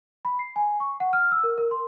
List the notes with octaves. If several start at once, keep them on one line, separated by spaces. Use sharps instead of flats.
B5
C7
G#5
C#6
F#5
F6
E6
A#4
A#4
C6